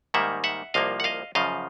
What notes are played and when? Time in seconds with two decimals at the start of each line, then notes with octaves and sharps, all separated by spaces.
0.14 G#2 D#3 G3 A#3 E5 F#5
0.44 E5 F#5
0.74 C2 C3 F3 A#3 D#5 F5
1.00 F#5
1.04 D#5 F5
1.35 F#2 C#3 F3 D#5 F5